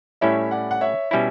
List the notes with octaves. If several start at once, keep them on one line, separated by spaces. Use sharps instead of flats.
A2 G3 C#4 E4 C#5 E5
D5 F#5
F#5
C#5 E5
B2 G3 C#4 E4 C#5 E5